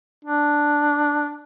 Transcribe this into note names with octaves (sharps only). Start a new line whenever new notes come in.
D4